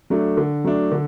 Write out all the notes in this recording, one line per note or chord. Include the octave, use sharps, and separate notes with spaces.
F#3 A3 D4
D3
F#3 A3 D4
D3